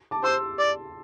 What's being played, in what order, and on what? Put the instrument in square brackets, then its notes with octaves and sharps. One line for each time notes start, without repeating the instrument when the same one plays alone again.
[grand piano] A5 D6
[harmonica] C5 [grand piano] C6 E6
[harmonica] D5